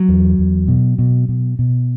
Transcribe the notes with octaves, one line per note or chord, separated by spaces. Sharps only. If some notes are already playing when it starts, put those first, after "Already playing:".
Already playing: F#3
E2
E2
B2
B2
B2
B2